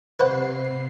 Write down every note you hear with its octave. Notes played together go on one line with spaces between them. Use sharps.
C3 B4 C5 F#5 C7